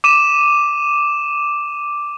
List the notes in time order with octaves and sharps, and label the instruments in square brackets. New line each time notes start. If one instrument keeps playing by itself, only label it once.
[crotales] D6 D#7 E7